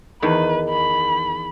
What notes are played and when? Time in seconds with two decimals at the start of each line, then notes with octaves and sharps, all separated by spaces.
0.22 E2 D#3 B4
0.70 B5